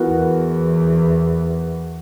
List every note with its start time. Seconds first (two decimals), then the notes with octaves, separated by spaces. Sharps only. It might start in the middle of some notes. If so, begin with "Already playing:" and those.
Already playing: E3 B3 F#4 A#4
0.09 E2